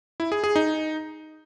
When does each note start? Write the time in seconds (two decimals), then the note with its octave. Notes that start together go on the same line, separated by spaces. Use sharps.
0.20 E4
0.32 G#4
0.44 G#4
0.56 D#4